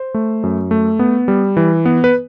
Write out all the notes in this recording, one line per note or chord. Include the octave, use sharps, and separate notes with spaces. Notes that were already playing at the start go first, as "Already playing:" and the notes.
Already playing: C5
A3
F#2
A3
B3
G3
E3
B3
B4